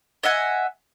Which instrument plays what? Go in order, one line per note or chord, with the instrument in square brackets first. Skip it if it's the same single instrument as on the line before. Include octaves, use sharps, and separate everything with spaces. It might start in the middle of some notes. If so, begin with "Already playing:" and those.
[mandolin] D#5 E5 F#5 G#5